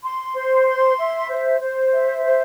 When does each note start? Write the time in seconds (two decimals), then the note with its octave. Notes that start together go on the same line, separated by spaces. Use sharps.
0.03 C6
0.35 C5
0.67 C6
0.98 E5
1.29 C5
1.61 C5
1.92 E5
2.24 C5